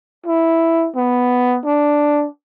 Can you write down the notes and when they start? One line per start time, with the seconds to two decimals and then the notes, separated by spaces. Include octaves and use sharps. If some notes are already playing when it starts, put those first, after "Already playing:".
0.26 E4
0.96 B3
1.65 D4